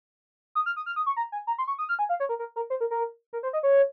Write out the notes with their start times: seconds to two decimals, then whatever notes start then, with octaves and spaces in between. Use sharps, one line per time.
0.55 D#6
0.66 F6
0.76 D#6
0.86 F6
0.96 D#6
1.06 C#6
1.17 A#5
1.32 G#5
1.47 A#5
1.58 C6
1.68 C#6
1.79 D#6
1.89 F6
1.99 G#5
2.09 F5
2.20 C#5
2.29 A#4
2.39 A#4
2.56 A#4
2.70 C5
2.81 A#4
2.91 A#4
3.33 A#4
3.43 C5
3.53 D#5
3.63 C#5